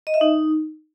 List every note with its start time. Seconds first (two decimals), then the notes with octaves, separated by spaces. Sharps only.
0.07 D#5
0.14 E5
0.21 D#4